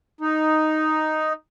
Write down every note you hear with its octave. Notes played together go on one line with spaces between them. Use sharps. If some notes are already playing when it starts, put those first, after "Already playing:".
D#4